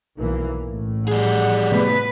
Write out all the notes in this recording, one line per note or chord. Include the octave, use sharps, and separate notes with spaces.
B1 E3 A#3
A1 A2
G3 G#4 F#5
C3 A3 B3 B4